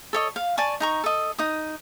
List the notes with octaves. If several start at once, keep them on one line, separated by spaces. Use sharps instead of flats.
A4 C#5 D#5
F5
D5 G#5 A5 C#6
D#4 A#5 C#6
A4 D#5
D#4 D#6